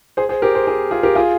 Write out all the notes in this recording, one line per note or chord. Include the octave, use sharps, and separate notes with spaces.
G#4 C5
G#4 C5
G4 A#4
G#4 C5
G#4 C5
F4 G#4
G4 A#4
F4 G#4